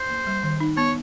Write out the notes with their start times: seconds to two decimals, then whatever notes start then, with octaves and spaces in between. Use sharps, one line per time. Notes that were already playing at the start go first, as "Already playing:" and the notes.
Already playing: C5
0.10 A#3
0.27 G3
0.43 D#3
0.60 D#4
0.77 B3 C#5